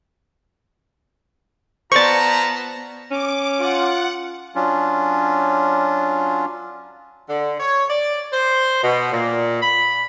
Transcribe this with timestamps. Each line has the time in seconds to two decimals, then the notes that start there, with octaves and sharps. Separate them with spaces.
1.92 B3 F4 C5 D5 A5 A#5 C#6 A6
3.11 C#4 D6
3.60 F4 F#5
4.55 F#3 C#4 D4 F4
7.28 D3
7.60 C#5
7.89 D5
8.33 C5
8.83 B2
9.12 A#2
9.62 B5